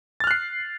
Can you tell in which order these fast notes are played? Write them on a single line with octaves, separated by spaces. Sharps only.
A6 F6 F#6 C7